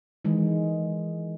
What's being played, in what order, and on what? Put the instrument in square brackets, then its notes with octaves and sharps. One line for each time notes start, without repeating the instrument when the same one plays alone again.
[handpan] D#3 E3 G#3